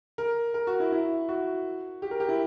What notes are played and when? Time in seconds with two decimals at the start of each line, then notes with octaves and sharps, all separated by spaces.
0.18 A#4
0.54 A#4
0.67 F#4
0.80 E4
0.92 E4
1.29 F#4
2.02 G4
2.11 A#4
2.20 G4
2.29 E4